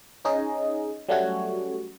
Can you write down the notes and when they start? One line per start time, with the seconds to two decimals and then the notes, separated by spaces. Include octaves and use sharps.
0.25 C#4 D#4 G#4 D#5
1.09 F#3 G3 A3 C#4 F#4 C#5